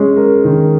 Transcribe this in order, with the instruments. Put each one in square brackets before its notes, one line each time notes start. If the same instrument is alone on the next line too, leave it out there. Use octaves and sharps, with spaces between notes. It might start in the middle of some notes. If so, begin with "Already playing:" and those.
Already playing: [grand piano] G#3 C#4
A#4
D#3